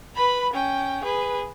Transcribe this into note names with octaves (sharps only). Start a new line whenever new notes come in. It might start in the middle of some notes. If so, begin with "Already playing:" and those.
B4 B5
C#4 G5
G#4 B4